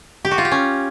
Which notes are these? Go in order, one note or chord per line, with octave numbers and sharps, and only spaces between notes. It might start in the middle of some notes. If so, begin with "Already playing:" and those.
G4
F#4
F4
G4
C#4